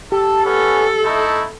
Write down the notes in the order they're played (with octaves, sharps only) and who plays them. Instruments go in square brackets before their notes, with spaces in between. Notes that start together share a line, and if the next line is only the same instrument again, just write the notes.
[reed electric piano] G4 [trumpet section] A4
[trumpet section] B3 C#4 [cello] A4
[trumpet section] A3 D#4 E4